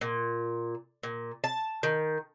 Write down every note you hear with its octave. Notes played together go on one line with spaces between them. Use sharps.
A#2
A#2
A5
D#3